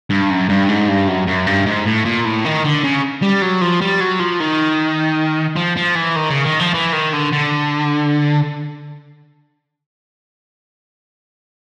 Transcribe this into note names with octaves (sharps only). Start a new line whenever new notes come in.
G2
F#2
G2
G#2
G2
F#2
F#2
G2
G#2
A2
A#2
A2
D#3
D3
C#3
G3
F#3
F3
G3
F#3
F3
D#3
F3
F3
E3
D#3
C#3
D#3
F3
E3
D#3
D3
D3